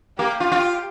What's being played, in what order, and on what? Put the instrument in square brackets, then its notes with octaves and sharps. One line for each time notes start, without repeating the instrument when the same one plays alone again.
[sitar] A#3 [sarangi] G4
[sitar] F4
F4